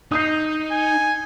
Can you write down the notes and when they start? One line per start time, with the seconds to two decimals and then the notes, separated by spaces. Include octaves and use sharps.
0.12 D#4 D#6 G6 C7
0.72 G#5